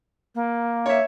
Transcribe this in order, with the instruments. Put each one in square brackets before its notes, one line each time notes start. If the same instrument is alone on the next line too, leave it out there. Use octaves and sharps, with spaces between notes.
[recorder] A#3
[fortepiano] C#5 E5